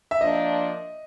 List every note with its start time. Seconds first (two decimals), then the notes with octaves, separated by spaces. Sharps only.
0.11 E5
0.21 F3 A#3 D4 D#5